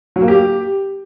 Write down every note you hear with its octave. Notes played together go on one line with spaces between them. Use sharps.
F#3
A#3
G4